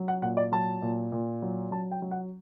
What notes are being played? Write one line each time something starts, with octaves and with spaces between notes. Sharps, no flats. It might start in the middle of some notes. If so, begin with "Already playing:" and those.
Already playing: F#3
F#5
A#2 F#5
D5
F#3 A5
A#2
A#2
F#3
F#3 A5
G5
F#3
F#5